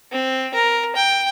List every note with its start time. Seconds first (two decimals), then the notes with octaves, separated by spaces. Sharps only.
0.12 C4
0.54 A#4
0.96 G5